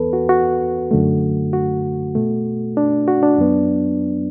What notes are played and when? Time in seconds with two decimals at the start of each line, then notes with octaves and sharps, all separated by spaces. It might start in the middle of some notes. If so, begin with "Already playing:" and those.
Already playing: E2 E3 B3 A4 B4
0.13 F#4
0.29 F#4
0.91 F#2 D3 A3
1.53 F#4
2.15 B2 A3
2.77 D4
3.08 F#4
3.23 D4
3.38 F#2 F#3 B3